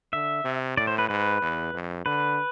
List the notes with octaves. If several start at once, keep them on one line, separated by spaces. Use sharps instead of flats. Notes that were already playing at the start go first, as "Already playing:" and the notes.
D3 E5
C3
A2 D5
C5
B4
G#2 B4
E2
F2
D3 B4